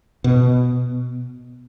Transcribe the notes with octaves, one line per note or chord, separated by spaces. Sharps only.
B2